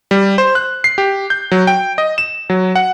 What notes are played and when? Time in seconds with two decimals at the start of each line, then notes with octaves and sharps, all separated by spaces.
0.11 G3
0.38 C5
0.55 F#6
0.84 C7
0.98 G4
1.30 G6
1.52 F#3
1.67 G5
1.98 D#5
2.18 E7
2.50 F#3
2.75 F#5